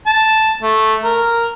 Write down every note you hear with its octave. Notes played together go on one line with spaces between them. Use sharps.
A5
A3
A#4